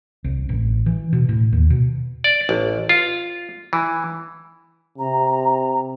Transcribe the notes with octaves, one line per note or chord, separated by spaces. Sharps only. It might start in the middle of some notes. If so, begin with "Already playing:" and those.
C2
A1
E3
B2
A2
D#2
B2
D5
A1
F4
E3
C3 A#5